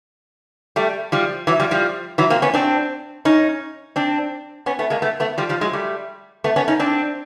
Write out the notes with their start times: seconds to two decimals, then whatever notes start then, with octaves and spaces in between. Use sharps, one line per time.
0.76 G3 A3
1.12 F3 G3
1.47 E3 F#3
1.60 F3 G3
1.71 F3 G3
2.18 E3 F#3
2.30 A#3 C4
2.42 B3 C#4
2.54 C4 D4
3.25 C#4 D#4
3.96 C4 D4
4.66 B3 C#4
4.79 A3 B3
4.90 G#3 A#3
5.02 A3 B3
5.20 A3 B3
5.38 F3 G3
5.49 F3 G3
5.61 F#3 G#3
5.73 G3 A3
6.44 A3 B3
6.56 B3 C#4
6.68 C#4 D#4
6.79 C4 D4